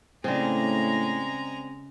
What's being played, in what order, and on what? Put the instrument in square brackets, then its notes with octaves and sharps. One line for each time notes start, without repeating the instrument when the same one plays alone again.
[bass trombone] A2 [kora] C#3 [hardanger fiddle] G#3 A#5 [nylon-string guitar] C4 D4